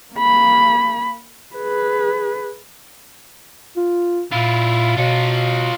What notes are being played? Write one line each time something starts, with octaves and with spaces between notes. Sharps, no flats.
A#3 B5
G#4 B4
F4
A#2 E4 F4
B2 F4 C#5